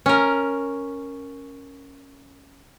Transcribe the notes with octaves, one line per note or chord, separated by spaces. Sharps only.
C#4 A#4